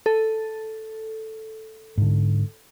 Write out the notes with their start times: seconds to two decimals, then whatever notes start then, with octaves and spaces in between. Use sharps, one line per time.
0.06 A4
1.98 G#2 D3